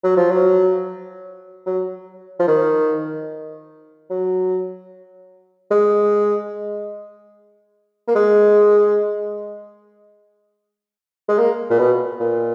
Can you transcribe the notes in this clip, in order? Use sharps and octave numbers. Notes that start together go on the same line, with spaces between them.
F#3
F3
F#3
F#3
F3
D#3
F#3
G#3
A#3
G#3
G#3
A#3
A#2
B2
A#2